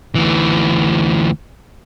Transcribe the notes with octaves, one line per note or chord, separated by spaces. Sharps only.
D2 E3